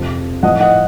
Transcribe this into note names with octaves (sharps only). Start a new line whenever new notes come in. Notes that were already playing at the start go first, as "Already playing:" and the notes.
Already playing: F2 C3 F3
A2 F3 D#5 F#5
D#5 F#5